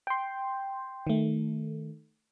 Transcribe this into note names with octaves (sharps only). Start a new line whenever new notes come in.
G5 C6
D#3 A3